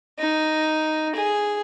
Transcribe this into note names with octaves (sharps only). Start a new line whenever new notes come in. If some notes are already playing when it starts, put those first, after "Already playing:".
D#4
G#4